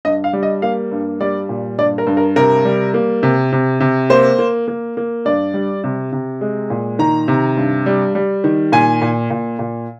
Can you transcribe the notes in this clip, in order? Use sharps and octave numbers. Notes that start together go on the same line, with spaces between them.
G2 D#5
F5
G3
D#5
A#3 F5
G2
G3 D5
A#2
G2 D5
A#4
G2
A#4
C3 A#4
G3
A#3
C3
C3
C3
A#3 C5
A#3
A#3
A#3
G2 D5
G3
C3
C3
G#3
A#2
D#3 A#5
C3
G2
G3
G3
D#3
A#2 G#5
A#2
A#2
A#2